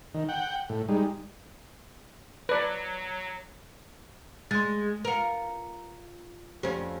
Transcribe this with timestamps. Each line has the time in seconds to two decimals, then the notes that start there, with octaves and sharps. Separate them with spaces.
0.14 D#3
0.29 F#5 G5
0.69 A2
0.89 G3 G#3 D#4
2.49 F#3 B4 D5
4.51 G#3 C6 A6
5.05 F4 A#4 B4 C#7
6.63 F2 C#4 G4 C5